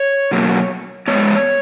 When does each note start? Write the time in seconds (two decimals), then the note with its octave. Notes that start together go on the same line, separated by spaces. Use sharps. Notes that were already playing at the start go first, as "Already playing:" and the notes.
Already playing: C#5
0.31 B2 F#3 A#3
1.08 G#2 D#3 G#3 B3 C#5